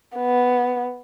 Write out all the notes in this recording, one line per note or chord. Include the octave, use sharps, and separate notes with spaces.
B3